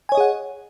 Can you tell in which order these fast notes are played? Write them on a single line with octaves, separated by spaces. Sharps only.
G#5 C#5 D#5 G#4 F#5